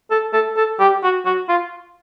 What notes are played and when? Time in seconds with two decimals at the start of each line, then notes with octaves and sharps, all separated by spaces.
0.11 A4
0.33 A4
0.57 A4
0.80 G4
1.03 F#4
1.26 F#4
1.49 F4